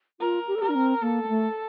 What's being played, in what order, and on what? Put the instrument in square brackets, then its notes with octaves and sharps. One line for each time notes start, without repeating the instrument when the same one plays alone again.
[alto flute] F4 [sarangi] A#4
[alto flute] G4
A4
[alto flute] G4 [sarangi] A#4
[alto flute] D4
C4
[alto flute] A#3 [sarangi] A4
[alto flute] A#3
A3